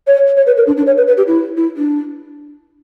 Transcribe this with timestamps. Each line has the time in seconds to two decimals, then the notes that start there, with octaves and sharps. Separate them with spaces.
0.07 C#5
0.37 C#5
0.47 B4
0.57 A#4
0.67 D4
0.77 D4
0.86 C#5
0.97 B4
1.07 B4
1.17 G4
1.27 E4
1.57 E4
1.77 D4